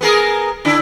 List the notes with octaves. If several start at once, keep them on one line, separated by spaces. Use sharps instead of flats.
B3 G#4 A#4
D3 D4 E4